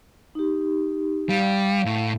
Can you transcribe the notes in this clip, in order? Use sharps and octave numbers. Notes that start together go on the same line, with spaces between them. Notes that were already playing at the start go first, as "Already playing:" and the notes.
D#4 G4
G3 F5
A2